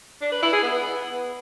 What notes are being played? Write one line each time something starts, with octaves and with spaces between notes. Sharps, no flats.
D4
B4
E4
G#4
B3